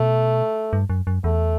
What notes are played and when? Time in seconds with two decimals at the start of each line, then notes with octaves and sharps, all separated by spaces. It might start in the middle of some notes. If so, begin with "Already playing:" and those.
Already playing: B2 A3
0.73 G2
0.90 F#2
1.07 F#2
1.24 E2 A3